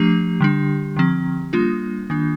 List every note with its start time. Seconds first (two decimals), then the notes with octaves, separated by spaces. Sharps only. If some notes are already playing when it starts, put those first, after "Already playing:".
Already playing: F3 A3 D4 G4
0.40 D3 G3 D4
0.97 D3 F3 C4
1.53 G3 A#3 D4 F4
2.10 D#3 A#3 D4